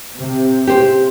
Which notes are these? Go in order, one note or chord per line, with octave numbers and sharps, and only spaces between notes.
C3
G4 C5